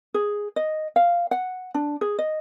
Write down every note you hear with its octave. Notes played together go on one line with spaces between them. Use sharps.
G#4
D#5
F5
F#5
D4
G#4
D#5